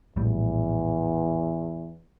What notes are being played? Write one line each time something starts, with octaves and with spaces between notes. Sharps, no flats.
A#1 E2 A2 G3